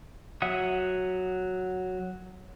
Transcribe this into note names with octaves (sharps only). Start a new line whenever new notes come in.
F#3 E5 F#5 D#6